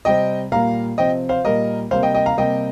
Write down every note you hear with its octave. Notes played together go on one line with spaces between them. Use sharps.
C3 G3 C4 D#5 G5
A#2 G3 A#3 F5 A#5
C3 F3 C4 D#5 G5
C5 F5
A#2 G3 A#3 A#4 D#5
C3 G3 A#3 C5 F5
D#5 G5
D#5 G5
F5 A#5
C3 G3 A#3 D#5 G5